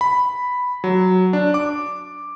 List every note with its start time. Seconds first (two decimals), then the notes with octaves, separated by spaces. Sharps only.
0.01 B5
0.84 F#3
1.33 D4
1.54 D6